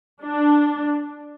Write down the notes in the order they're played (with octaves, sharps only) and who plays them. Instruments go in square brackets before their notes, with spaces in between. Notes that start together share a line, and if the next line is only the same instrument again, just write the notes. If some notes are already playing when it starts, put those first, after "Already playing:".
[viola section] D4